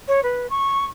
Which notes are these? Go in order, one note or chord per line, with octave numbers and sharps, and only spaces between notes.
C#5
B4
C#6